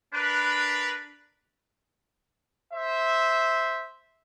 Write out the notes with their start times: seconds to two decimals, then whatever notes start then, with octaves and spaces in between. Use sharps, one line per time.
0.13 D4 A#4 B4
2.74 C5 E5